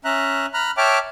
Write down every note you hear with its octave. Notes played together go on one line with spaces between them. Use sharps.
C#4 E5 A#5 F#6
A#5 B5 F6 F#6
C#5 E5 G5 A5 D6 F6